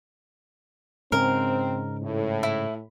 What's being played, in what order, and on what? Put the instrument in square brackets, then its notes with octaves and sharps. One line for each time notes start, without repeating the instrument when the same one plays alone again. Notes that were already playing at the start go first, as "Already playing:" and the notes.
[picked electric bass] G#2 C#3 [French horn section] C4 [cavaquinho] A#4
[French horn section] A2
[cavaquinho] E4